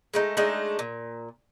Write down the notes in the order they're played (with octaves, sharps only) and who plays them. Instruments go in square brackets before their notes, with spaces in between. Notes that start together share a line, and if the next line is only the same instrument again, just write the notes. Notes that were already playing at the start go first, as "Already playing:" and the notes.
[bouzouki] G#3 A3 D#4
G#3 A3 D4 D#4
A#2